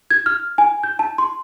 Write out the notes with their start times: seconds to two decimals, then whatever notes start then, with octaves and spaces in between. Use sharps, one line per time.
0.11 G#6
0.26 F6
0.58 G#5
0.83 G6
0.99 A5
1.18 C6